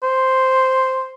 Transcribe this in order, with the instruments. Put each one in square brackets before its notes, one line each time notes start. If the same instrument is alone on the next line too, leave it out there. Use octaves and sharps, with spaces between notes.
[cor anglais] C5